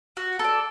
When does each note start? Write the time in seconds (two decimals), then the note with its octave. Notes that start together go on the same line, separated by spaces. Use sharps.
0.17 F#4
0.39 A4 D5